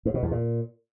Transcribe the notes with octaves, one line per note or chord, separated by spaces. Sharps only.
G#2
B2
E2
A#2